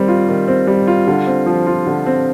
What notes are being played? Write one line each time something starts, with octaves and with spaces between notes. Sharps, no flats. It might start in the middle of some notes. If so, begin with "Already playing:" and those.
Already playing: D#3 G3 C4
F4
D#3
C4
G3
F4
D3
C4
F3
F4
D3
C4